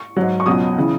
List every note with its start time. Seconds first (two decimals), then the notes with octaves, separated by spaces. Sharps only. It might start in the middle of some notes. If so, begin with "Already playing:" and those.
Already playing: C#6
0.16 G#2 F#3
0.40 C#6
0.46 C#2 B2 F#3 D#6
0.78 C#3 E3